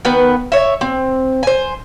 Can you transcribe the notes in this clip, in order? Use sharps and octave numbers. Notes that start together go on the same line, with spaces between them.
D#3 B3 B4
C#5 E5
C4
C5 G#5